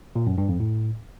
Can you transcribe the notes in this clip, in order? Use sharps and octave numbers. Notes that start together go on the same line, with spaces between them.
A#2
F#2
G2
F2
A2